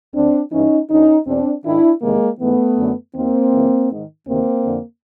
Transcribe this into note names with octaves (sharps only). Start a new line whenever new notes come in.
D2 D3 C4 D4
G2 E3 C#4 D#4
D2 D3 C#4 D#4
E2 B2 C4 D4
G#2 D#3 D4 E4
E2 C3 D#3 G#3 A#3
G#2 E3 A3 B3
F#2 D3
D#2 D#3 A#3 C4
F#2 C#3 E3
G#2 D#3
D2 C3 D#3 A#3 C4
F2 D3